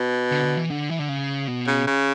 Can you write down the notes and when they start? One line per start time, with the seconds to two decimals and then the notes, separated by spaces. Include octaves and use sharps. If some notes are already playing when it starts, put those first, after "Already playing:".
Already playing: B2
0.31 D3
0.44 D3
0.57 E3
0.70 D3
0.89 E3
0.99 D3
1.09 C#3
1.47 B2
1.67 C#3
1.87 C#3